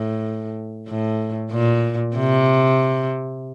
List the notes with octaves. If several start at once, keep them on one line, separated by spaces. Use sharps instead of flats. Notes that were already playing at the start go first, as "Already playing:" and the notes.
Already playing: A2
A2
A#2
C3